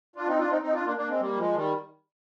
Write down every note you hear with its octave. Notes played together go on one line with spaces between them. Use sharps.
D4 F4
C4 D#4
D4 F4
C4 D#4
C4 D#4
D4 F4
A#3 D4
A#3 D4
G#3 C4
G3 A#3
F3 G#3
D#3 G3